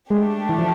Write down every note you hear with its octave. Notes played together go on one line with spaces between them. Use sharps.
G#3 A3 D4 G4
E3
F3